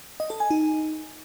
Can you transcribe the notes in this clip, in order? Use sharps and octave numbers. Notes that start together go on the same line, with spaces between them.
D#5
A4
G#5
D#4